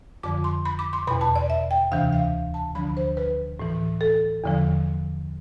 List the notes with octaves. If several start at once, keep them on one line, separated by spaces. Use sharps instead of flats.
F2 D3 F3 D6
C6
B5
D6
C6
E2 B2 B5
A5
D5
E5
G5
D2 C3 E3 F5
F5
A5
D2 D3 F3 B5
C5
B4
A2 E3
A4
E2 D3 F3